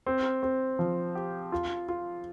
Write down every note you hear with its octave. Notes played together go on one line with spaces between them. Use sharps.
C4
C4
F3
G4
F4
F4